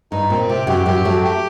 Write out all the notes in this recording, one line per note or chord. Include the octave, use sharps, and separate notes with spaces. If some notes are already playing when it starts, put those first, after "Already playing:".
G2 D#4
A#2 C4
C3 G4
F#2 F#3 G4
F#2 F#3 G4
F#2 F#3 A3
G4